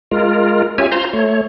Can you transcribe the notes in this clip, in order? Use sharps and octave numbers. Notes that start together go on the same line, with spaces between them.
G#3 F4 A#4
C#4 F4 G4 C#5 E5 G#5
F4 C5 A#5 C6
A3 C#5